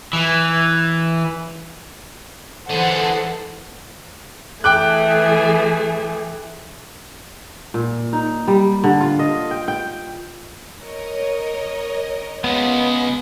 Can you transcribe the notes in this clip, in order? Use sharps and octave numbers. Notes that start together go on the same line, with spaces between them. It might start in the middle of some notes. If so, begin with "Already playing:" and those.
E3
D3 E3 G#4 A4 C5 F#5 A5
E3 A3 G#4 G5 D6 F#6
A#2
D#4
G3
D3
F4
D#5
G5
G5
A#4 C#5 D#5
C#3 G#3 B3